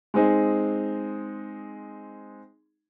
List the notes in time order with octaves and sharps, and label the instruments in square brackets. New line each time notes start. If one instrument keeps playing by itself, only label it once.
[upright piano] G#3 C4 D#4 G#4